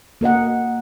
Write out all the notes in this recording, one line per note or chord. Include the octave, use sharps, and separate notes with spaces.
A#3 A#4 D#5 F#5